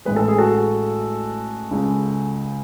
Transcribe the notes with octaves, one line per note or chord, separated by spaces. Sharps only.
A1 A2 G#3 B4
A4
G#4
F#4 A4
C#2 C#3 G#3